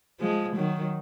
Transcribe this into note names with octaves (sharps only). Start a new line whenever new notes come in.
F3 G#3
D#3 F#3